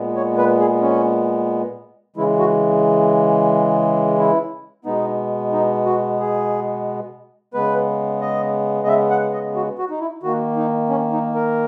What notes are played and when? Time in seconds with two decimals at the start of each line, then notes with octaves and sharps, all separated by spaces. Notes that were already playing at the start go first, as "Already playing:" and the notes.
Already playing: A#2 G#3 B3
0.16 C#5
0.38 B4
0.60 G#4
0.82 C#4
2.16 C#3 E3 G#3 E4
2.39 F#4
4.18 E4
4.85 B2 G#3 B3 D#4
5.53 D#4
5.86 F#4
6.20 G#4
7.54 C#3 G#3 B3 B4
8.21 D#5
8.83 D#5
8.88 E5
9.11 F#5
9.33 D#5
9.55 F#4
9.78 F#4
9.90 D#4
10.00 E4
10.23 D#3 A#3 F#4
10.57 D#4
10.90 C#4
11.13 D#4
11.34 A#4